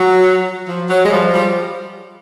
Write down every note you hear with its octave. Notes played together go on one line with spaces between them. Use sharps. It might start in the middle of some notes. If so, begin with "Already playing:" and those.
Already playing: F#3
F3
F#3
G#3
F3 G3
F3 G3